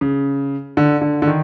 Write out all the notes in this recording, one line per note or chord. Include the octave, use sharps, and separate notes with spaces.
C#3
D3
D3
D3
D#3